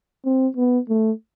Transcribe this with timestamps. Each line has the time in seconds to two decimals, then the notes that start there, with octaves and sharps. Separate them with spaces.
0.26 C4
0.57 B3
0.89 A3